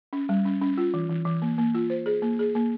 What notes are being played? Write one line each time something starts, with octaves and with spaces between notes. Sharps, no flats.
C#4
G3
C#4
C#4
F4
E3
E3
E3
A#3
A#3
F4
C5
G#4
A#3
G#4
A#3